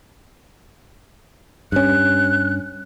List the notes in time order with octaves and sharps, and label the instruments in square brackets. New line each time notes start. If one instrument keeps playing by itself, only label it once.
[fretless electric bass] G2 C#4 [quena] F#6